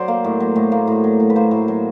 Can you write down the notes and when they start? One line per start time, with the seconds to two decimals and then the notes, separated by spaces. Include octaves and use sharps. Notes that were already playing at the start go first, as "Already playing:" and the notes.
Already playing: F#3 C5 D5
0.08 A#3
0.24 A2
0.40 F#3
0.56 A2
0.72 A#3
0.87 A2
1.04 F#3
1.20 A2
1.30 B4
1.36 A#3 C5
1.51 A2
1.68 F#3